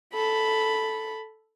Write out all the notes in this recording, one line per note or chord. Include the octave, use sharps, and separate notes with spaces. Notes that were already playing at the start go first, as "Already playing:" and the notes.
A4 B5